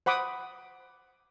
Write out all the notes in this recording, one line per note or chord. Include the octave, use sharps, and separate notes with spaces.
C5 F#5 B5 D6 D#6